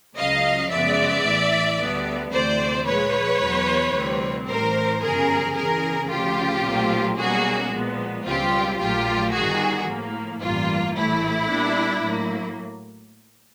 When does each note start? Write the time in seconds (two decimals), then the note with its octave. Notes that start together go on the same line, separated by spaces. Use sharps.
0.17 C#2 C#3 F#3 D#5 F5
0.71 F#2 C#3 F3 G#3 B3 D5 E5
1.25 A1 A2 E3
1.79 D2 D3 G3 B3
2.33 D2 C3 E3 A3 C5 D5
2.87 A#2 F3 G#3 B4 C#5
3.41 E2 B2 F#3
3.95 D2 C3 E3 G3 C4
4.49 A1 A2 E3 A#4 C5
5.02 G1 F#2 C#3 F3 G#4 A#4
5.56 E2 C#3 E3 G#4 A#4
6.10 D2 C#3 F3 F4 G4
6.64 B1 A#2 F#3 A3 C4
7.18 B1 B2 G3 A#3 C#4 F#4 G#4
7.72 A#2 F3 G#3 B3
8.26 C#2 B2 G3 C4 F4 G4
8.79 A#1 A#2 F#3 A3 F4 G4
9.34 G1 G2 D#3 G3 F#4 G#4
9.88 A2 F3 A#3
10.41 A1 G2 E3 G3 A#3 F4
10.96 A#1 A2 E3 A3 E4
11.49 A#2 G3 B3 D4
12.03 A2 F#3 A#3